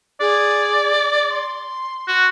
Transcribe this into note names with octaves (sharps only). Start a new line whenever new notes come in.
G#4 D5
C6
F#4